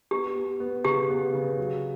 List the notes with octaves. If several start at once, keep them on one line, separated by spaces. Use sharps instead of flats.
B3 G4
B3
B3
C#3 G4
B3
C#3
F#3